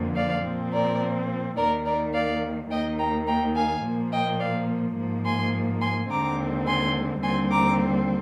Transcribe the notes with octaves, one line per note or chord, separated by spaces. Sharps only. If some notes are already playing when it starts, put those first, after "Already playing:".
Already playing: F2 D3 F3 A#3
D5 F5
A#2 F3 C4
A#4 D5
D#2 D#3 A#3 A#4 D5
A#4 D5
D5 F5
D#2 D#3 A#3 D#5 G5
G5 A#5
G5 A#5
F5 G#5
A#2 F3 A#3
D#5 G5
D5 F5
G#2 F3 A#3
G#5 C6
G#5 C6
D#2 D3 G#3 C4 A#5 D6
G#5 C6
D#2 D3 G3 C4 G#5 C6
A#5 D6